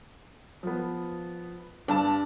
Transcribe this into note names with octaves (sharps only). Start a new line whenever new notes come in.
F3 B3
G2 D4 A5